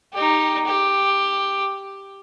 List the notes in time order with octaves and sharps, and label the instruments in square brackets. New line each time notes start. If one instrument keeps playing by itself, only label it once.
[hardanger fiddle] D#4 G4
G4